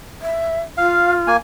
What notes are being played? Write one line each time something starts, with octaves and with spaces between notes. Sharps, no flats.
E5
F4 F5
A#3 G#5